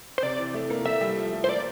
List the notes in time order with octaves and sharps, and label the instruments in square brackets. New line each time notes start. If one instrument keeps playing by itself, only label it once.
[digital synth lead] C5
[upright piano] C3 [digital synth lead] D5
[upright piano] E3
A3
A#3
[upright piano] A3 [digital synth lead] E5
[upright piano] G3
F3
A3
[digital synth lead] C5
[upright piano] A#3 [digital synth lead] D5